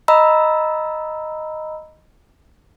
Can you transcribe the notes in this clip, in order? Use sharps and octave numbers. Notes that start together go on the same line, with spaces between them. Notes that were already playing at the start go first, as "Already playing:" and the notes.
D#5 A#5 B5 E6